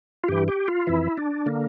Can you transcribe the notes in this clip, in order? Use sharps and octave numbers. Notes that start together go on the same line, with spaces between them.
F4
G2 E3 G4
G4
F4
F2 E3 E4
D4
D3 A#3